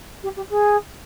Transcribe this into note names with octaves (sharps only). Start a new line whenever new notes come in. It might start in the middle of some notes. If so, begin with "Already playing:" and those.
G4
G4
G#4